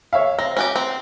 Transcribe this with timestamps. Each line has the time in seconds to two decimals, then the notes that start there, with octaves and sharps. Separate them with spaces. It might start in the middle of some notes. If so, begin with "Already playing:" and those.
0.13 C#5 E5 F5
0.39 C4 A#6
0.57 C#4 F#4 G4
0.76 C4